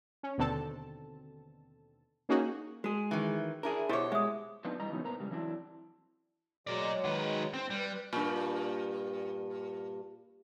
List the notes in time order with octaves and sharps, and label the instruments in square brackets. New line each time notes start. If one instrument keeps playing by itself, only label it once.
[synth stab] C#4
D#2 B2 D3 C4 A4 A5
A#3 C#4 D#4 F#4 G#4
[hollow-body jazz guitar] G#3 G#4 [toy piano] F#4
[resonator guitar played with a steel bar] D#3 E3
[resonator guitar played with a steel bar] D4 E4 [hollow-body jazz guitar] G#4 A#4
[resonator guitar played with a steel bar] B2 C#5 [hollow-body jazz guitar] E4 C5 [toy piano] G4 E5 D6
[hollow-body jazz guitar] G#3 [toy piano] E5 D#6
[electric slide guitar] F3 B3 C4 D4 D#4 F4
C3 E3 G3 D#5 A#5
C#3 E3 F#3 B3 D#4 C#5
A#2 B3 A#4 C5 A#5
G#2 C#3 G3
E3 F#3 C4 D4 E4
[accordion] F#3 G#3 [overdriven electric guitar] A#4 D5
[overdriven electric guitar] D#3 B4
[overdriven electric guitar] C4 [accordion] C6
[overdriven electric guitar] G3 [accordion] B4
[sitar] G2 A#2